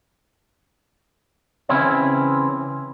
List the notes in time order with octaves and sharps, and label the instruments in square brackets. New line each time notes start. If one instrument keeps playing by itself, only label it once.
[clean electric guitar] C#3 E3 C4 C#4 E4